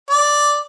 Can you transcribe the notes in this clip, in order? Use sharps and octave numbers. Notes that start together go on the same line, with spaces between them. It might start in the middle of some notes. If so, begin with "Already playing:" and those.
D5